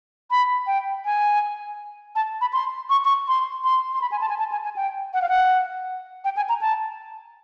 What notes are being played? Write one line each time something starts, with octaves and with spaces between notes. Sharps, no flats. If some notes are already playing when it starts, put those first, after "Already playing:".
B5
G5
G#5
A5
B5
C6
C#6
C#6
C6
C6
C6
B5
G#5
A5
G#5
A5
G#5
G#5
G5
F#5
F5
F#5
G5
G#5
A#5
A5